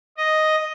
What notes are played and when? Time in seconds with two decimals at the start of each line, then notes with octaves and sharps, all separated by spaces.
0.17 D#5